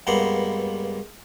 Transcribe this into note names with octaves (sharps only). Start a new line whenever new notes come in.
C#2 G2 A#3 B3 F#5 C6